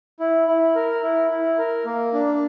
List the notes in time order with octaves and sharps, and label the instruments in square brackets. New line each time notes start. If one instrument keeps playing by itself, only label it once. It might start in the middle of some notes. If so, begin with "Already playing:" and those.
[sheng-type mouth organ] E4
E4
A#4
E4
E4
A#4
A#3
D4